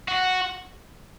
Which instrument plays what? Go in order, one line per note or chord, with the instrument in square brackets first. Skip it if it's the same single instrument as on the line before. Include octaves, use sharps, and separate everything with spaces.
[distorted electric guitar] F#4